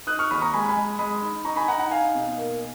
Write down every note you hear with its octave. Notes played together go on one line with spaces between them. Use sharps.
D#4 D#6 F#6
C#6 F6
D#2 B5 D#6
A#5 C#6
G#3 G#5 B5
G#5 B5
G#3
G#3 B5 D#6
D#4
D#4 A#5 C#6
G#5 B5
D#4 F#5 A#5
F#5 A#5
D#4 F5 G#5
B2
A#3